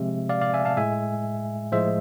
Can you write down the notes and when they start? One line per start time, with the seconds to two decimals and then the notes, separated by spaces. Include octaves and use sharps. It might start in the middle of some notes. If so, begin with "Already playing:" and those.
Already playing: C3 F3 G#3 E5
0.29 D5 F5
0.41 D5 F5
0.54 E5 G#5
0.65 F5 A5
0.77 A2 G#3 E5 G#5
1.72 A2 F3 G#3 C5 E5